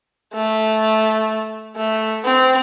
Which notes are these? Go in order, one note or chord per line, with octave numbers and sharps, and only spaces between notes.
A3
A3
C4